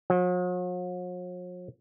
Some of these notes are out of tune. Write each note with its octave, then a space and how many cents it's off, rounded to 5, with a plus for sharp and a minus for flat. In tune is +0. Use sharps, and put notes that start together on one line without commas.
F#3 -45